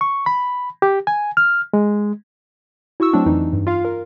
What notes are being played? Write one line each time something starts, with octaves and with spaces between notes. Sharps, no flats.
C#6
B5
G4
G#5
F6
G#3
E4 F#4 C#6 E6
F#3 A3 C4 D4
F2 E3 D#4
G2
F4 F5
A#4